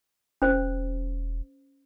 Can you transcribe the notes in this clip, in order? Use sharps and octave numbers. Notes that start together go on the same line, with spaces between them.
E1 C#4 C5